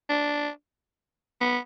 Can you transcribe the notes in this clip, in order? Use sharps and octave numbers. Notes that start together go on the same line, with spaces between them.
D4
B3